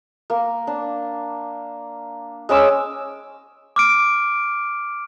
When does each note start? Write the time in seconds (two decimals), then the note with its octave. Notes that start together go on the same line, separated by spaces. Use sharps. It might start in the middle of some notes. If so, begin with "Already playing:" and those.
0.30 A#3
0.67 D4
2.49 G#3 C#4 D6 E6
3.76 D6 F6 D7